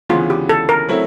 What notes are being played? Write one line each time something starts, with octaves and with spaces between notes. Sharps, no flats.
D2 C#3 E3 G#3 B3 F4
G4
A4
A#4
F#3 A3 C4 E4